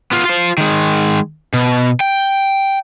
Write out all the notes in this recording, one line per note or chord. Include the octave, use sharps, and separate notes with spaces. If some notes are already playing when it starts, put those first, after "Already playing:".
B3 F4
F4 C5
D#3 G#3
B2
G5